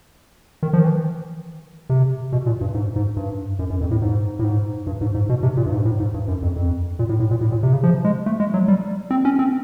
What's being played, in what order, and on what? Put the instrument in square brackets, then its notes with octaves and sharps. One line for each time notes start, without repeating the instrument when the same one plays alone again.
[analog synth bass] D#3
F3
D#3
E3
C3
B2
A#2
G2
G#2
G#2
G2
F#2
F#2
F2
A2
G#2
A2
G#2
G2
G#2
G#2
B2
C3
A#2
G2
G#2
A2
G#2
G2
F#2
F2
F2
A#2
A2
A2
A#2
A2
A#2
C3
C#3
F3
G#3
A3
G#3
F#3
G3
C4
C#4
C4